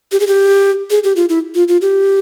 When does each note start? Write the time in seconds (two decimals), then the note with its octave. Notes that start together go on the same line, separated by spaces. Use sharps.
0.12 G4
0.20 G#4
0.27 G4
0.90 G#4
1.04 G4
1.16 F4
1.29 E4
1.55 F4
1.68 F4
1.81 G4